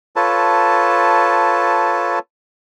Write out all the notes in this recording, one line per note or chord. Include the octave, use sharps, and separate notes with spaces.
F4 A4 B4 C#5 A5